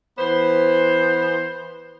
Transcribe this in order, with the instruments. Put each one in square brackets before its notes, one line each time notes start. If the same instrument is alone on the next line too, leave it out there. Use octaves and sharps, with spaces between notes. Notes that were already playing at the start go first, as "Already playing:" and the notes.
[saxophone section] E3 B3 C5